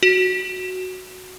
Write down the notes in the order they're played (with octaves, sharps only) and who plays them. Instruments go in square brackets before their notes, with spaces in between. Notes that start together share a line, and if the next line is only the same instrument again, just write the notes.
[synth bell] F#4